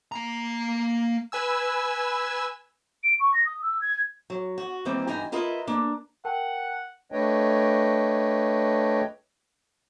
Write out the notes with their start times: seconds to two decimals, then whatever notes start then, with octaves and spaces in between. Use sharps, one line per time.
0.12 A#3 A#5
1.32 B4 G#5 E6
3.03 D7
3.20 C#6
3.34 A#6
3.46 D#6
3.62 E6
3.81 G#6
4.30 F#3
4.58 F#4
4.85 D#3 E3 G3 A#3 C4
5.07 G2 D3 E3 D#4 G#5 A#5
5.32 E4 F4 A#4 B4 D#5
5.67 A#3 D4
6.25 A#4 F#5 G5 A5
7.12 A3 D4 B4 C#5 D#5 G5